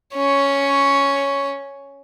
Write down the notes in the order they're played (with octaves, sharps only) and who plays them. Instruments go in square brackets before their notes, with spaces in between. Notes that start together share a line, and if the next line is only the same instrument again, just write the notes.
[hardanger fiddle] C#4 C#5